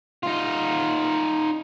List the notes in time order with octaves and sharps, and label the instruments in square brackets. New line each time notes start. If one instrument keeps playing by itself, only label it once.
[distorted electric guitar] D#4 F4